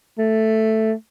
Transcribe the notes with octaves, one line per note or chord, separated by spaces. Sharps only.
A3